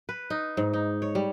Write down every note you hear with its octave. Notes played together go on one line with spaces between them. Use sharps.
B4
D#4
G#2
D#4
C#5
G3